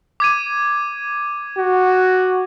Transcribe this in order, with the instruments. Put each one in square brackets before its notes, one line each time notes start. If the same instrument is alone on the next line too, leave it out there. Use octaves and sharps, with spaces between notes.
[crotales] D6 G#6 D#7
[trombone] F#4